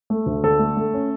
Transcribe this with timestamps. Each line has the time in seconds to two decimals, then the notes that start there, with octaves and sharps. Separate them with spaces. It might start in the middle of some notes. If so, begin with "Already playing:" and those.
0.10 A3
0.26 D2
0.44 D3 A4
0.59 A3
0.77 A3
0.94 C#4